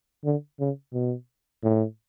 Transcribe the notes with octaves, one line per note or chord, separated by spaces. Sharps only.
D3
C#3
B2
A2